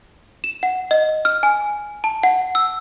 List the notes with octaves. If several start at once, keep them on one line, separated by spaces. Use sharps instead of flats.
E7
F#5
D#5
F6
G#5
A5
F#5
E6